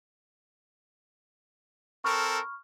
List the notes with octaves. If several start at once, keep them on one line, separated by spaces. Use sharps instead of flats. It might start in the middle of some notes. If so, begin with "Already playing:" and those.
C4 A4 A#4 B5 C#6 F6